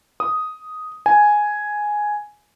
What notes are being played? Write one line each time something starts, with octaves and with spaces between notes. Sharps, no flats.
D#6
G#5